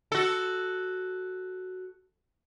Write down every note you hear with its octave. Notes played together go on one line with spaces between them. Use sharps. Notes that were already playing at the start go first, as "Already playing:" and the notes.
F#4 A4